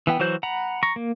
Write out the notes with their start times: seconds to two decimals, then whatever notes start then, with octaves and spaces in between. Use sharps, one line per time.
0.07 E3 B3 G5
0.19 E3 F#3 F#4 C5 G6
0.43 F#5 A#5 B5
0.83 A#5 C#6
0.96 A#3